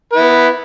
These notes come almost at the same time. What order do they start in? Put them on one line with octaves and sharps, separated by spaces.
B4 E4 B3